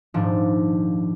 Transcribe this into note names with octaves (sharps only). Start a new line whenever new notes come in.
D#1 G#2 F3 D4